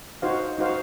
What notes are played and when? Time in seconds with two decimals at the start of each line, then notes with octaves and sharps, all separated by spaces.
0.22 D#4 F#4 C5 F5
0.58 D#4 F#4 C5 F5